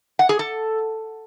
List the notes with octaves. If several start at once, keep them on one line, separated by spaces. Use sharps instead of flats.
F#5
G#4
A4